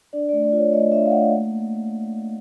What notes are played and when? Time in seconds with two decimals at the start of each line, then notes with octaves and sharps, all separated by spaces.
0.13 D4 D5
0.29 D5
0.33 A3
0.43 D5
0.52 F4
0.57 C#5
0.73 A3 D#5
0.92 D4 E5
1.06 F5
1.11 A3 F#5
1.31 A#3
1.51 A#3